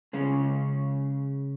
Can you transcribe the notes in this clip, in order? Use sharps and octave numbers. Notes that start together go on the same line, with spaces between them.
C#3 G#3 C#4